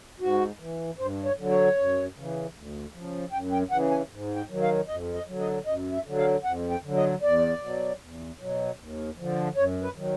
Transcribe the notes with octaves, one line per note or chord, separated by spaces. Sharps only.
G#2 F#4
E3
G2 C5
C#5
D3 F#3
C#5
F#2
C#3 E3
D2
C#3 F3
F#2 G5
G5
C#3 E3 F#5
G#5
G#2
G5
D#3 F#3
F5
F2 D#5
D#5
D3 F#3
D#5
F#2 D#5
E5
D3 F#3
F5
F2 F#5
G5
D3
F#3
D#5
E2 D5
B2 F#3
E2
B2 F#3
D#2
D3 F3
F#2 C#5
B4
D#3 F#3